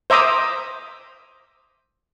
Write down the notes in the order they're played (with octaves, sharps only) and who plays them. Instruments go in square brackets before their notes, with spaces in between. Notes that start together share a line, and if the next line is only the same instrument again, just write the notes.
[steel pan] C5 E5 A#5 D6 D#6